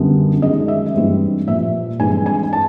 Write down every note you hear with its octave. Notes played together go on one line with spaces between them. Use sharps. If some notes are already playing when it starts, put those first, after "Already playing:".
Already playing: F#2 D3 G3 B3
F#2 D#3 G#3 D#5
E5
G2 E3 G3 C4
A#2 F3 A#3 E5
G2 E3 G#3 C4 G#5
G#5
A5